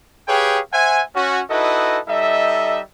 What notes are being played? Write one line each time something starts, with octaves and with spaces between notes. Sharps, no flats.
G4 G#4 B4 C#5 F5 G5
C5 E5 F#5 G#5
C#4 F#4
D#4 E4 F#4 A4 B4 D#5
G3 D#4 A4 D#5 E5